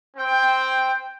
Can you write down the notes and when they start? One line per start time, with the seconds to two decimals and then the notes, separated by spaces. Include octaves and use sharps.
0.16 C4 G5